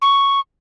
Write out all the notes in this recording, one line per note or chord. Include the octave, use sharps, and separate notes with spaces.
C#6